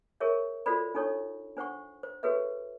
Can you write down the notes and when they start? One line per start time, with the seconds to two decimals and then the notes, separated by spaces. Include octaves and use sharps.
0.20 G#4 A#4 C#5 E5
0.66 F4 F#4 A4 C5 D5 B5
0.95 D4 D#4 A4 C#5 C#6
1.57 D4 C5 F#5 C#6
2.03 C5
2.23 F#4 G#4 A4 B4 C#5 E5